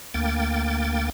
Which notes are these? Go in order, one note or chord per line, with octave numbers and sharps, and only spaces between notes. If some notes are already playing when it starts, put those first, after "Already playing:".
D2 A#3 G5 A6